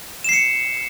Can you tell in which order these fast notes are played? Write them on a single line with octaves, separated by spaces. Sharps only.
E7 C7 C#7